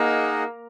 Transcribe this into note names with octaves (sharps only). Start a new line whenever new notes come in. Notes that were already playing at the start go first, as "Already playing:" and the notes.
Already playing: A#3 D#4 G#4 D#5 F#5